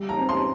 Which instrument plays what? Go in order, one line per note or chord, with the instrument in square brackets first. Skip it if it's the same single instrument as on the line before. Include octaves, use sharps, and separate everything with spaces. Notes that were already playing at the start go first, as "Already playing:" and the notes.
Already playing: [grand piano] G3
[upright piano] A#5
[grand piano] C4
[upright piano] C6